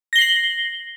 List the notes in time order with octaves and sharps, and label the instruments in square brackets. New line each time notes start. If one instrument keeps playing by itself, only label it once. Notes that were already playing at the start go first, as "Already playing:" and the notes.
[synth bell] A#6
G7
C7
F#7